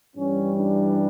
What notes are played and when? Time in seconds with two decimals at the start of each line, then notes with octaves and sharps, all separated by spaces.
0.16 G2 E3 G3 C#4
0.55 D4